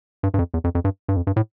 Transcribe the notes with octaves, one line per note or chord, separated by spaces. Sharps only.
G2
G2
F2
E2
F2
F2
G2
G2
F2
G2
A2